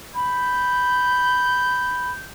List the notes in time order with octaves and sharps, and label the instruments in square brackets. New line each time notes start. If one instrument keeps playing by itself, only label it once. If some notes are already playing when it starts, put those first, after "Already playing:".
[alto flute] B5 [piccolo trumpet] G6